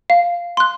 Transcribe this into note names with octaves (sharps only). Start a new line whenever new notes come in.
F5
C6 F#6